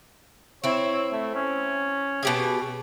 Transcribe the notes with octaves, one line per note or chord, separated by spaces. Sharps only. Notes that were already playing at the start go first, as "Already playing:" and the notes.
C4 E4 C#5
A3
C#4
B2 G4 G#4